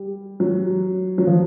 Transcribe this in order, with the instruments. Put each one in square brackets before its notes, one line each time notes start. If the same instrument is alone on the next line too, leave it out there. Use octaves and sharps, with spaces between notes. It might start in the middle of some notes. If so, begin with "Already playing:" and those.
Already playing: [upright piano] G3
F#3
F#3
F3